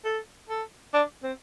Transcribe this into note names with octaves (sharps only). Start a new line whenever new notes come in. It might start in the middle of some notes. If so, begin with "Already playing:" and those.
A4
A4
D4
C4